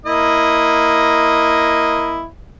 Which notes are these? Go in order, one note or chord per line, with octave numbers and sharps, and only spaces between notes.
A#3 E4 D#5